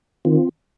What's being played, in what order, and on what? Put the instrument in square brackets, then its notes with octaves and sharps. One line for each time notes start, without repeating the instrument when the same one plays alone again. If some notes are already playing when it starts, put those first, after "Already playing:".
[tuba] D#3 [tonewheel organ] C4 F4